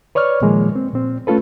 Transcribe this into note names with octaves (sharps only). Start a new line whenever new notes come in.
B4 C#5 D5 C#6 F6
A#2 D#3 F3 G#3 A#3
C4
A#2 C4
A3 C#4 F4 A4 B4